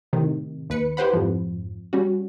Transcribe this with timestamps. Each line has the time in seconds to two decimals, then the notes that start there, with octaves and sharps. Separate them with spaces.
0.13 A2 C3 D#3
0.70 D#2 B4 C#7
0.97 E4 G4 B4 C5 F#5 B5
1.13 F2 G#2 F3
1.93 G3 C#4 F#4